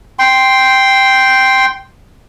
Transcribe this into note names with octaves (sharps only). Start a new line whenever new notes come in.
G5 C6